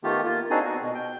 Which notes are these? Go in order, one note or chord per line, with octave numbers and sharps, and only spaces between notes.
D#3 A3 B3 F4 G4
A#3 F4
C4 D4 D#4 F#4 G#4 G#5
B3 F#4
B2
G5